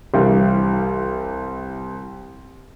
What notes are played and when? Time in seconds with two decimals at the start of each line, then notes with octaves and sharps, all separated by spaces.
0.14 C2 E3 G3 F5